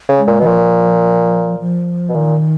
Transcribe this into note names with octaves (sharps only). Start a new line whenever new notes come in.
C#3
G#3
A#2
B2
D#3
A#2 F3
F3
B2
A#2 D#3